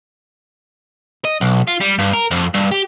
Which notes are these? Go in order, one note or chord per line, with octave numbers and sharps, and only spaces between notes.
D#5
B1
F4
G3
G2
A#4
F2
G2
G4